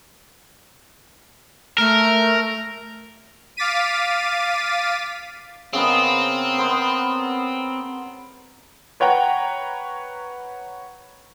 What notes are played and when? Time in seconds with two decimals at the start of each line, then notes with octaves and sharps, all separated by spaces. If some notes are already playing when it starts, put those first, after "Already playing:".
1.78 A3 A#4
3.57 F5 D6 A6 B6 D#7
5.73 C#3 B3 C4 A#4
6.58 B3 A#4 C5
9.00 B4 C#5 F#5 G5 A#5